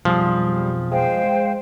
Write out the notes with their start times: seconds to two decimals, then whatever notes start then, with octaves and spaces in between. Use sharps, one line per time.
0.05 B1 F2 F3 G3 G#4
0.92 G#3 C5 F5 G5